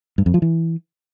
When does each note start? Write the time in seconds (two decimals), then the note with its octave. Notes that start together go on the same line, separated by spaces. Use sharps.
0.18 G2
0.26 F2
0.34 F3
0.42 E3